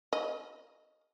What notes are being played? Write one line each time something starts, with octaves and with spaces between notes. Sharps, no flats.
D#5